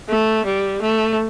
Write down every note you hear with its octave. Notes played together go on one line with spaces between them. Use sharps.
A3
G3
A3